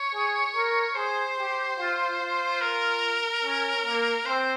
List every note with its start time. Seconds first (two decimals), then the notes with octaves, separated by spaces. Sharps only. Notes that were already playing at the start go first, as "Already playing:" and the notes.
Already playing: C#5
0.14 G#4
0.55 A#4
0.95 G#4 C5
1.38 G4
1.79 F4
2.20 F4
2.62 A#4
3.44 C#4
3.85 A#3
4.26 C4 C5